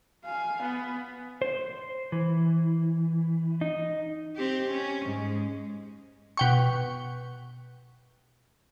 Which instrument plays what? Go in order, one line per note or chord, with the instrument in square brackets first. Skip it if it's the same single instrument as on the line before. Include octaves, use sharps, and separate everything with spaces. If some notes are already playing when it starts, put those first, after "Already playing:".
[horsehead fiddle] F5 G#5
B3
[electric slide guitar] C5
E3
D#4
[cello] C4 G4
C#4
G#2 G#3
[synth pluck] B2 G5 C#6